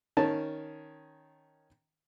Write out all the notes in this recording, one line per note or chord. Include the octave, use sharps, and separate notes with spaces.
D#3 C#4 A5